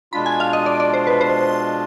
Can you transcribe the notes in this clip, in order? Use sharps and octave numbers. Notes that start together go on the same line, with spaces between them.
B2 G#3 D4 F4 B5
G#5
F5
D#5
D5
D5
C5
B4
C5